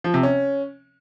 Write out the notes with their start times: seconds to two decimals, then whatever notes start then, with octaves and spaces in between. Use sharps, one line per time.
0.04 F3
0.14 C3
0.23 C#4